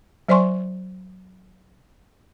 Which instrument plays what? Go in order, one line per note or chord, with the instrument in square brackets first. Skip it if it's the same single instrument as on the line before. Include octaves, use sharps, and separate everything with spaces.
[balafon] F#3 C5 D5 G#5 C6 C#6